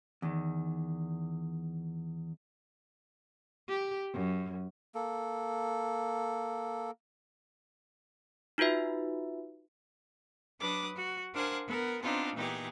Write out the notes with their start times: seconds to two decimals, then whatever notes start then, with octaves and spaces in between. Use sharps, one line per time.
0.22 E2 D#3
3.68 G4
4.13 F#2
4.95 A#3 A4
8.58 D#4 F4 F#4 B4 E5
10.59 F#3 D4 B4 D6 D#6
10.97 F#4
11.34 D4 A#4 C5 F5 F#5 G#5
11.67 B3 A#4
12.01 B3 C4 D4 D#4 F4
12.35 A#2 E3 B3 D#4 G4 G#4